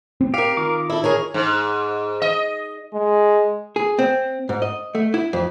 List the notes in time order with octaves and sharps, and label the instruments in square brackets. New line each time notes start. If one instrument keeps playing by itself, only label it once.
[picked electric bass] C4
[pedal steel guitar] G4 [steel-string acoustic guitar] A#4 F5
[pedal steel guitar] D#3 F4 D6
[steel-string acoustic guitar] E4 A4
G#4 A#4 C#5
[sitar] G#2
D#5
[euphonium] G#3
[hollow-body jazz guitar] G#4
C4
G#2
D#5
A3
E4
F2